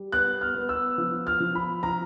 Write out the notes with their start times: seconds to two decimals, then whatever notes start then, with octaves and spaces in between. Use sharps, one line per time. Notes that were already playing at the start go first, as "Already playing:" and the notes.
Already playing: G3
0.12 B3 F#6
0.41 F6
0.55 B3
0.69 E6
0.98 F3
1.27 F6
1.40 F3
1.55 B5
1.83 F3 A#5